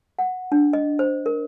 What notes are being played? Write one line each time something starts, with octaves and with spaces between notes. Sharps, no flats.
F#5
D4
D#5
C5
A#4